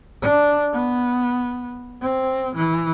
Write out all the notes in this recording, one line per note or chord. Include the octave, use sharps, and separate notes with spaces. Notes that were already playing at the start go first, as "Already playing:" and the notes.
D4
B3
C4
E3